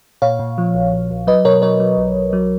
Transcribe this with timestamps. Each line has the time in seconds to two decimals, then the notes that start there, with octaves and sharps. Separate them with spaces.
0.22 A#2 C#5 F5
0.39 A#2
0.58 F3
0.74 A#1
0.93 A#1
1.10 A#1
1.27 F#3 B4 D#5
1.45 B2 A#4 C#5
1.62 F#3 A#4 C#5
1.80 F#3
1.97 B1
2.15 B1
2.33 F#3